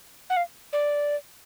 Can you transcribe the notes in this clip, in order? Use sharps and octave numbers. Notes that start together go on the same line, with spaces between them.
F#5
F5
D5